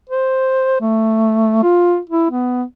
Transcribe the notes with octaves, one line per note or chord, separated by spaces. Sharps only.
C5
A3
F4
E4
B3